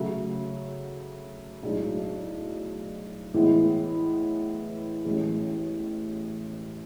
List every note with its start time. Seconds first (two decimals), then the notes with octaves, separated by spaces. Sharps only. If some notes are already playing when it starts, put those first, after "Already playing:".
Already playing: C#3 F#3 A3
1.63 B1 A2 G#3 D4
3.34 A2 E3 G#3 B3 E4
5.05 A1 A2 E3 G#3 C#4